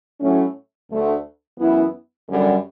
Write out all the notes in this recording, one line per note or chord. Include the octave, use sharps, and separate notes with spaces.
A2 F#3 A3 C#4
D2 D3 A3
F#2 E3 B3 E4
F#2 D3 G3